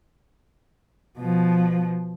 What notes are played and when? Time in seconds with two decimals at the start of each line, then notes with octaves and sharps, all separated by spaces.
1.19 B2 F3